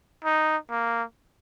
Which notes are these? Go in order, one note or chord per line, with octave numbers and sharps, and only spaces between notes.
D#4
A#3